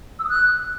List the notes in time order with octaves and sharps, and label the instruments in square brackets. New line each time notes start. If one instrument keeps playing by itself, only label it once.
[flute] E6
D#6
F#6